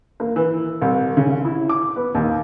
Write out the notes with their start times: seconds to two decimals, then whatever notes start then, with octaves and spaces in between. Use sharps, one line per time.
0.20 A#3
0.36 E3
0.81 C2
1.17 C#3
1.45 E4
1.69 D6
1.96 B3
2.15 D#2